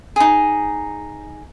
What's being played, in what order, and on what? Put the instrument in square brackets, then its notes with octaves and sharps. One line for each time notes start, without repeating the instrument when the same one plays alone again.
[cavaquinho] D#4 G#4